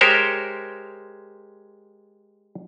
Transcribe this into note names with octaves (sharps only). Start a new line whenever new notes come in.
G#3 G4 A#4 C5 C#5